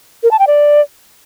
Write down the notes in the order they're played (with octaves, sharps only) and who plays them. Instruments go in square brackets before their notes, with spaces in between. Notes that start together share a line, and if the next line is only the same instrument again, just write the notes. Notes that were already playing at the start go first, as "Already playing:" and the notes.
[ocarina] A#4
A5
G5
D5